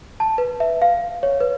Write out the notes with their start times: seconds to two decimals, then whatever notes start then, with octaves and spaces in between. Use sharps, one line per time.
0.20 A5
0.38 B4
0.60 E5
0.82 F5
1.23 C#5
1.40 B4